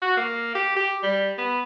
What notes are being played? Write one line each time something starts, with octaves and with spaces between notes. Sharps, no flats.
F#4
A#3
G4
G4
G3
B3